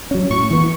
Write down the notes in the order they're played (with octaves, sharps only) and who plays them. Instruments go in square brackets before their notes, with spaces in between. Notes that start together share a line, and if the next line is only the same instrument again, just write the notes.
[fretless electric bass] F#3 C#4
[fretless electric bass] A2 [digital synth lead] C#6
[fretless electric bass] E3 B3